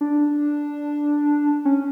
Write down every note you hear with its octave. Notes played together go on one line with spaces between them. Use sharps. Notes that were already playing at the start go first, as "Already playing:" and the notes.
D4
C#4